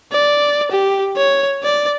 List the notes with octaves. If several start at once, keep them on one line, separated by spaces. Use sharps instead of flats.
D5
G4
C#5
D5